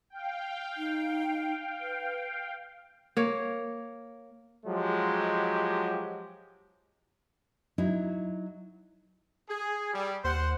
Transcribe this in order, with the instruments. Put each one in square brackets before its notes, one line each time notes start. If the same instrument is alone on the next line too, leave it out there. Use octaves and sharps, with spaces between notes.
[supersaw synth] F5 G5
[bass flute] D#4
B4
[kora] A#3 C#5
[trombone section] F3 F#3 G#3 G4
[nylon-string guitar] F#3 D#4 E4
[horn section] G#4
G3
[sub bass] D#2 [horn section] C5 F#5